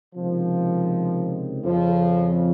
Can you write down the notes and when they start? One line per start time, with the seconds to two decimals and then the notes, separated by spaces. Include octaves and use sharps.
0.15 C#2 C3 D#3 F3
1.64 F2 C#3 F3